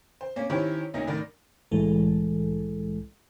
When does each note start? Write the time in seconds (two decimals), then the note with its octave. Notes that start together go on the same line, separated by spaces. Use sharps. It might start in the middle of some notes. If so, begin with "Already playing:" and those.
0.21 C5
0.36 A#3 C#4
0.50 D#3 C#4 E4 G4 C5 C#5
0.94 D2 A#2 C#4 D#4 A#4 A#6
1.07 A2 D#3 A#4 D5 A6
1.71 C2 A2 E3 G#3 A4